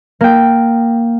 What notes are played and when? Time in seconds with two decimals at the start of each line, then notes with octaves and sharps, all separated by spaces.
0.21 A#3 G5